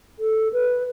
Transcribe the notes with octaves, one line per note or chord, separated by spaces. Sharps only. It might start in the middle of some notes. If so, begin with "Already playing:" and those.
A4
B4